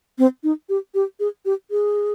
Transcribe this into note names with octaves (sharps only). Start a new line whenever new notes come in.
C4
D#4
G4
G4
G#4
G4
G#4